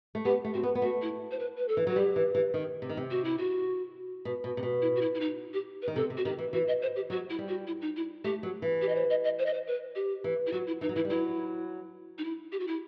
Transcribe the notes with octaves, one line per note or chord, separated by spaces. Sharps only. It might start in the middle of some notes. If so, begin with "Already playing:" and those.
A3
B3 G4
A3
C4 F#4
B3
B3
A3 F#4
E4
C5
B4
B4
A4
E3
F#3 F#4
G3 G4
E3
E3
D#3
C3
D#3
C3
F#4
E4
F#4
B2
B2
C3
B2
E4
F#4
E4
E4
D#4
G4
B4
D#3
C3 A4
C3
F#4
D#3 G4
E3
E3 F#4
D#5
C5
G4
F#3 F#4
E4
G3
F#4
E4
D#4
E4
A3 G4
F#3
E3
G4
D#5
C5
D#5
D#5
C5
D#5
C5
B4
G4
E3
E4
F#3 F#4
E4
E3 D#4
F#3
E3 E4
G3
F#3 E4
D#4
E4
G4
F#4
E4